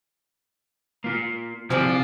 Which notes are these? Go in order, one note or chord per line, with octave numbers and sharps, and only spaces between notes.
A#3 F4
C3 F3 C4 G4 G#4 D5